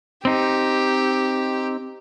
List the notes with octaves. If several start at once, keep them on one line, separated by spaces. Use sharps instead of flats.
C4 D#4 G4